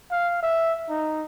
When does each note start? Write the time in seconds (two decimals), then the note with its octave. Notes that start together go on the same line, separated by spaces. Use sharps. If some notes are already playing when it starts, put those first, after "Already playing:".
0.11 F5
0.43 E5
0.90 D#4